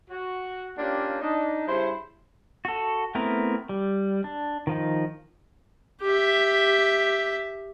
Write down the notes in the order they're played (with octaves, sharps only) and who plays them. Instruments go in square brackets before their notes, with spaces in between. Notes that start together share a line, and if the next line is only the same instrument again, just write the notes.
[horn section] F#4
A#3 C#4 D4 F4 G4
D4 D#4
G2 C#3 E4 C5
[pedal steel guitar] F#4 A4
A3 B3 C4 E4 A#4
G3
D4
D#3 F3 D#4
[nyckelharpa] G4 E5